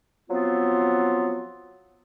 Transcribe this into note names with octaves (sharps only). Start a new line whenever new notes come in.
F3 F#3 B3 C4 F4